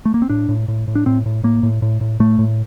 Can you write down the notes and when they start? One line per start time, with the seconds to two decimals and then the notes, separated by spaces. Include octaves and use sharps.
0.05 A3
0.14 A#3
0.22 C4
0.29 A2 D4
0.49 A2
0.68 A2
0.88 A2
0.95 D4
1.06 A2 C4
1.26 A2
1.44 A2 A#3
1.63 A2
1.82 A2
2.01 A2
2.20 A2 A3
2.39 A2